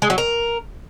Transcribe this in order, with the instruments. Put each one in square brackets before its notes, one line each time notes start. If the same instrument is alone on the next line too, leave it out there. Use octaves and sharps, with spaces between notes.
[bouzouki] G#3
F#3
A#4